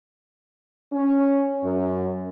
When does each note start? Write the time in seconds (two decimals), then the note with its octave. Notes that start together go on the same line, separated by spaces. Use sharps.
0.93 C#4
1.64 F#2